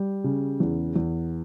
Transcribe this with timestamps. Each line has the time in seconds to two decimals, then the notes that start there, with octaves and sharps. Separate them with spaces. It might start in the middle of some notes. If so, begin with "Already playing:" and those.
Already playing: G3
0.24 C#3
0.60 E2
0.96 E2